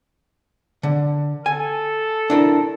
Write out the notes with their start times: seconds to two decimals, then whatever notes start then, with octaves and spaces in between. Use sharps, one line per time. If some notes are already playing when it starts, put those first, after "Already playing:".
0.83 D3
1.46 A4 G#5
2.30 D4 E4 A#4